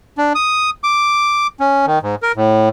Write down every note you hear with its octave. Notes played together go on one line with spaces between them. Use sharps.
D4
D#6
D6
C#4
D#3
G#2
A#4
A2